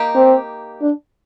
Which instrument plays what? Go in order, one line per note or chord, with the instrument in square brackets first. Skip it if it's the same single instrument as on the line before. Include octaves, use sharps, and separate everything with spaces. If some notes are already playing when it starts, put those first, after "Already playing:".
Already playing: [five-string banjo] A#3 D#4 G4
[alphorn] C4
D4